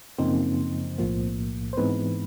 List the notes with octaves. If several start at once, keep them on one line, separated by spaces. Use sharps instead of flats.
F#2 C#3 F3 A#3 C4 D#4 C5
B1 A2 F3 A#3
C5
G#2 E3 G#3 B3 C4 D#4 B4